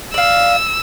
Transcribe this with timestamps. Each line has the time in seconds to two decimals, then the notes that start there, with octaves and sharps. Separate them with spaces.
0.14 D5 F5 E6